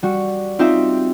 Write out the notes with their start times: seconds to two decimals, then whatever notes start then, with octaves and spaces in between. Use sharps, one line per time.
0.03 G3 F#4
0.59 C4 D#4 F4 G4 E5 G5